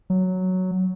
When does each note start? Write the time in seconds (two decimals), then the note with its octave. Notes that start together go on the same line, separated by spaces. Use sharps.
0.10 F#3